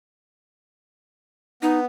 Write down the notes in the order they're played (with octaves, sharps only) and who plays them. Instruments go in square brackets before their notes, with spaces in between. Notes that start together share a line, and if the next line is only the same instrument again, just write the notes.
[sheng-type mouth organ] B3 [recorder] D#4